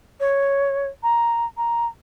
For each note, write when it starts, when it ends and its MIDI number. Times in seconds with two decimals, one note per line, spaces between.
0.20 0.87 73
1.03 1.45 82
1.57 1.86 82